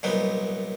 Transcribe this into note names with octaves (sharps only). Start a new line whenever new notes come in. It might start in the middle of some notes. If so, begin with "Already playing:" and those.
C2 A#2 F#3 B3 D#4